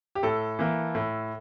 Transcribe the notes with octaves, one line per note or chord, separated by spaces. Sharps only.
G4
A2 A4
E3 A#3
A2